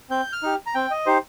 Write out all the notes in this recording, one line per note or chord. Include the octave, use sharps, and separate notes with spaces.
C4 G6
F6
D#4 G4
A#5
C4 G5
D#5
D#4 G4 C5